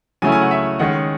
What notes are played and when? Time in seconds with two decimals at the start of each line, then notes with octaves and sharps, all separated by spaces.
0.22 C#3 F#3 A3 C#4 E4 G#5
0.32 G#5
0.41 F#5
0.51 E5
0.79 D#3 G#3 C#4 F#5